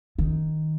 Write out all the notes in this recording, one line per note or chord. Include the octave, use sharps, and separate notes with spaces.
D#3